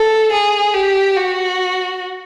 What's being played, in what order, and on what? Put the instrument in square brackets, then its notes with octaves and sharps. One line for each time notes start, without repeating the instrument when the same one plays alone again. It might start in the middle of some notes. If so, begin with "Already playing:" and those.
Already playing: [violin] A4
G#4
G4
F#4